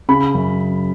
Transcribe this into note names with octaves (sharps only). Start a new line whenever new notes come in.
C#3 B5
F#2